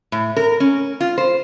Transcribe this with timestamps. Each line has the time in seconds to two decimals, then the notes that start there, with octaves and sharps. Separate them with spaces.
0.12 A2
0.36 A#4
0.60 C#4
1.01 F4
1.18 C5